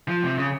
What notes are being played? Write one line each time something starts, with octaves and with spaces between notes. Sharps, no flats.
F3
C3
C#3